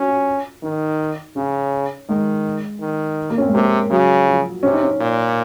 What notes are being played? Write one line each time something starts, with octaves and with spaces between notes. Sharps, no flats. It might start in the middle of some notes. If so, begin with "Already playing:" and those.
Already playing: C#4 F#4
F4
D#3 D#4
C#3 C#4
D#3 G#3
D#3
A#3
C#4
C4
G#3
C3 A#3
C#3 F#3
F3
C3 C#4
D#4
C#4
A#2